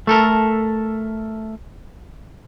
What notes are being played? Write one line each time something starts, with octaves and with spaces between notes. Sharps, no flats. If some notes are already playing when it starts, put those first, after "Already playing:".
A3 A4 A#4